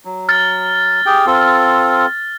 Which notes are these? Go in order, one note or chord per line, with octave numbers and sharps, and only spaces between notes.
F#3
F6 A6
G4 G#4 G5
C4 F4 A4